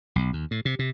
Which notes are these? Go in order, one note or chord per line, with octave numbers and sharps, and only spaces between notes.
B1
D#2
A2
C3
C3